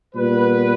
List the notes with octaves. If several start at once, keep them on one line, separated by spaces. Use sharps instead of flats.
A#2 G3 B3 B4